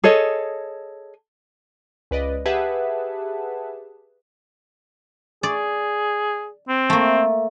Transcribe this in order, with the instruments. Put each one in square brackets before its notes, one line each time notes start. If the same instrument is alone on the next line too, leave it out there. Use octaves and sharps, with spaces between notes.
[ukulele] G#4 A4 C#5 D#5
[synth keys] C#2 B4 D5 D#5
G4 G#4 B4 E5 F#5 A5
[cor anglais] G#4 [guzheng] D5
[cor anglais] C4
[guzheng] A3 A#3